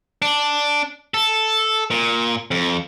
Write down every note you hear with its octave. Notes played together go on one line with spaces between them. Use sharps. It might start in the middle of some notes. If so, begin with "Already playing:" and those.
D4
A4
A#2
F2